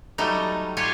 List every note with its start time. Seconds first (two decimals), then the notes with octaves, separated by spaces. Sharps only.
0.18 F#3 G3 A3 D#4
0.77 F4 G4 C#5 G#5